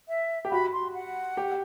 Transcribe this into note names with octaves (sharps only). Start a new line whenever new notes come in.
E5
G4
F#4 B5
C6
F#5
G4